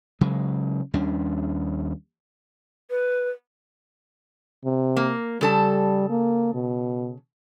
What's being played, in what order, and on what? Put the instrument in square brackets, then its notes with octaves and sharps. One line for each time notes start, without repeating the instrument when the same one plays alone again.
[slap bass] C#3 F#3 G#3
D#2 G3 C#4 D4
[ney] B4
[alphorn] C3
[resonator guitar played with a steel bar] A#3
[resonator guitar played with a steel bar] C#3 A4 A5 [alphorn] G3
[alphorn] A#3
B2